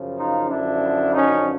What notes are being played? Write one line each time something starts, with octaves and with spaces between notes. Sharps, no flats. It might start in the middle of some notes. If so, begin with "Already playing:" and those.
Already playing: F#2 C#3 F3
D#4 F4
F#2 D3 F3 D4 E4
C#4 D#4